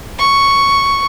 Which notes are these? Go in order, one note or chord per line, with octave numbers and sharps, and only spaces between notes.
C#6